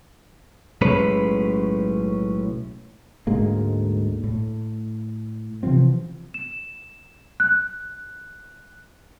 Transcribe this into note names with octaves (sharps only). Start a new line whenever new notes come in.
B1 A2 G#3 C#4 B4
D2 G#2 G#3 A#3
A2
C3 E3 F3 C4
E7
F#6